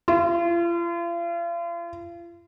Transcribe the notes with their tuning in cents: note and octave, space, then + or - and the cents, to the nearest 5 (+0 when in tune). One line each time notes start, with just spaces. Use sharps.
F4 -40